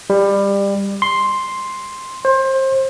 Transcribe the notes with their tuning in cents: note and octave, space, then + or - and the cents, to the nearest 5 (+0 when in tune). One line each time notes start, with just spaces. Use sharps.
G3 +20
C6 +5
C5 +25